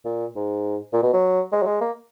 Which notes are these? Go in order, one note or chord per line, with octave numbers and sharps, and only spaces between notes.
A#2
G#2
A#2
B2
F#3
G#3
F#3
G#3
A#3